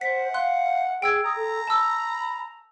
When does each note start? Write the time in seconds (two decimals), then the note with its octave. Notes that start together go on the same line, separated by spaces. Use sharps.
0.01 C5 F#5 B6
0.34 F5 C6 F#6
1.02 G#4 G5 E6 G#6
1.25 A#5 D#6
1.36 A4
1.68 A5 B5 E6